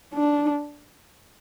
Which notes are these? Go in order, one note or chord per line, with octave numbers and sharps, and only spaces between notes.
D4